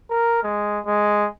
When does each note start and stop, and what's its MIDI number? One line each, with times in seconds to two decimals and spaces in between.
0.10 0.44 70
0.44 0.80 56
0.86 1.28 56